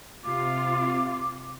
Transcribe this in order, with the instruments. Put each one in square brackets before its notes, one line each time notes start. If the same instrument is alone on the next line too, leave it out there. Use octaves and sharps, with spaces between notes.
[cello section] C3 F4 [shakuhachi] D6